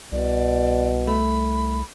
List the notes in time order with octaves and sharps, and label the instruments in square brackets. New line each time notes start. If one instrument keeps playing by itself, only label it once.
[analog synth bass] C2 [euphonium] B2 [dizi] D5
[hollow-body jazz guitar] A3 [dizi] B5